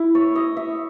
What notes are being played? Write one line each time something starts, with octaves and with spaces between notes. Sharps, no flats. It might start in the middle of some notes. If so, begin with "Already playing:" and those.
Already playing: E4
C#5
D#5
E5